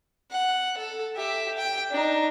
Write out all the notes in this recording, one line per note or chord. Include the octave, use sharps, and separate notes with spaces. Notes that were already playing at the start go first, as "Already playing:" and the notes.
F#5
A4
G4 E5
G5
D4 D#4